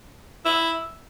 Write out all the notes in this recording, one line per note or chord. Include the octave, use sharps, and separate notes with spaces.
E4